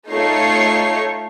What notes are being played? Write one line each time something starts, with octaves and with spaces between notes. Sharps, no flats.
A3 D#4 F4 C#5 C#6 C7